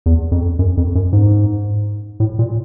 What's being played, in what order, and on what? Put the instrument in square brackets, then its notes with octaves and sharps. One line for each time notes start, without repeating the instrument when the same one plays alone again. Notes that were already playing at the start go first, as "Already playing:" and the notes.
[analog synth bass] E2
F2
F#2
F2
F#2
G#2
A2
A#2